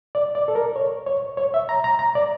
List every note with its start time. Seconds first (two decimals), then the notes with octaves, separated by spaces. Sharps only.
0.15 D5
0.35 D5
0.48 A4
0.55 A#4
0.76 C#5
1.07 C#5
1.37 C#5
1.54 E5
1.69 A#5
1.84 A#5
1.99 A#5
2.15 D5